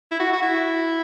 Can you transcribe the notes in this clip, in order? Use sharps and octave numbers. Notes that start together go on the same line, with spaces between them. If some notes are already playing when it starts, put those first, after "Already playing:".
E4
F#4
F#4
E4